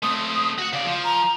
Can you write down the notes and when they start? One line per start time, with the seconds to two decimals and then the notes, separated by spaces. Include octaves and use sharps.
0.03 A3 C4 D#6
0.58 F#4 F#5
0.73 C#3 D5 F5
0.85 F3
1.03 A#5